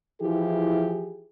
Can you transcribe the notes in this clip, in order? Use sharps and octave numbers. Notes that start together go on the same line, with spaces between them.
E3 F3 E4 G4 G#4